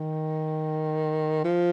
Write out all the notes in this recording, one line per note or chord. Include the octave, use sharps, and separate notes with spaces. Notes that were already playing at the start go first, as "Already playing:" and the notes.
Already playing: D#3
F3